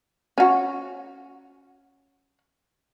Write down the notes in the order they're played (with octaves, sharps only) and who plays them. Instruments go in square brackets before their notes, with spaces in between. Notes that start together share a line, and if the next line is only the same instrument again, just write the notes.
[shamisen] C#4 F#4